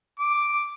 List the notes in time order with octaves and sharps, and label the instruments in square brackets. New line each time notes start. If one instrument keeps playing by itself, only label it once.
[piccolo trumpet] D6